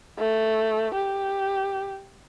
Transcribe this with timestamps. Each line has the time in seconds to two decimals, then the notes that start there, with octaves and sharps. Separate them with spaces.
0.19 A3
0.95 G4